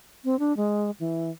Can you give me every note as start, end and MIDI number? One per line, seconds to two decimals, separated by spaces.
0.25 0.39 60
0.39 0.55 62
0.57 0.91 56
1.00 1.30 52